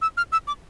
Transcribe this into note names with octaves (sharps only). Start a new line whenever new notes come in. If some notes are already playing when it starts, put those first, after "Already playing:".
E6
F6
E6
D6